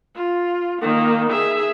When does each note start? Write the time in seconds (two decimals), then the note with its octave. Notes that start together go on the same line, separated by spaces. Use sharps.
0.16 F4
0.81 D#3 A#3
1.30 G#4 E5